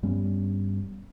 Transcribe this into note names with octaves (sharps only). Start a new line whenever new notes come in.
G2 G3 B3 C#4